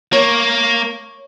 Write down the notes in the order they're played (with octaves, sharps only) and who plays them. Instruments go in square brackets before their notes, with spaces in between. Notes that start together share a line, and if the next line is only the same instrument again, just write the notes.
[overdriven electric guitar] A#3 [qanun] C#5